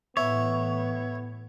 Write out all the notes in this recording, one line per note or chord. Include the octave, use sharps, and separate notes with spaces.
A2 E3 B3 E4 C#5